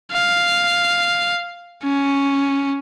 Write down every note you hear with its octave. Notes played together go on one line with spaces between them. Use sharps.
F5
C#4